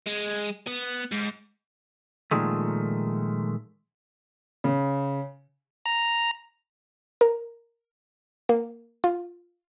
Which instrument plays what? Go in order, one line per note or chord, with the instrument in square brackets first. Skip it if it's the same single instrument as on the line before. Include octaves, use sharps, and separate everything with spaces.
[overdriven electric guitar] G#3
B3
G#2
[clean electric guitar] A#2 D#3 F3 G#3 A3
[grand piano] C#3
[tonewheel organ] A#5
[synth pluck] A#4
A#3
F4